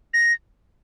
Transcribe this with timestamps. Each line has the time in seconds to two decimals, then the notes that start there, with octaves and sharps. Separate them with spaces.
0.14 A#6